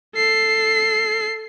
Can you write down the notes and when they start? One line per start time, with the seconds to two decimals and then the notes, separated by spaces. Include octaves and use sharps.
0.15 A4 C7